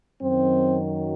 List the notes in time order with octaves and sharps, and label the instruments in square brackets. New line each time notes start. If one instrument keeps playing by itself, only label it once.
[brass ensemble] F#2 D#3 F#3 C4